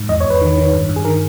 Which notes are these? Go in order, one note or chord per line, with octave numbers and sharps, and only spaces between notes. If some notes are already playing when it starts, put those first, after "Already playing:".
Already playing: G#2
E2 D#5
C#5
E2 B4
D#3
D#3
G2
G2
G#4
D#3 A#4